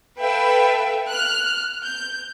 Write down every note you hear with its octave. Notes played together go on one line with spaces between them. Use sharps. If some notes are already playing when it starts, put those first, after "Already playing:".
A4 B4 E5 F5 G5
F6 F#6
G6